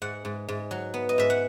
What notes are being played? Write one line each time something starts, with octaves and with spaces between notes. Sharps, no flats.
G#2 F#5
G#2
G#2
F#3
B3
D#5
G#2 E5
F#5